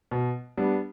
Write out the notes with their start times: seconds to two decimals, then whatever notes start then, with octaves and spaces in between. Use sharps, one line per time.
0.11 B2
0.57 G3 B3 D4